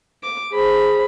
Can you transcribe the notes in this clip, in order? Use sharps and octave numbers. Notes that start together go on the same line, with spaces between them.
D6
G#4 C5 B5